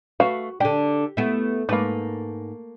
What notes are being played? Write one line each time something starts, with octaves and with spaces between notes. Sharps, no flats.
A3 F#4 B4 F5
D3 D4 G4
A3 B3 E4
G#2 A3 A#3 B4